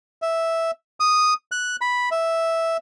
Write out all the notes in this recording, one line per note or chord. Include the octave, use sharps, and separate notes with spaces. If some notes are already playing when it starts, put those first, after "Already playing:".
E5
D#6
F#6
B5
E5